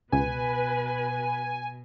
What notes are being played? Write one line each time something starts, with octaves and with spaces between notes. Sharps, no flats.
C#2 B2 B4 G#5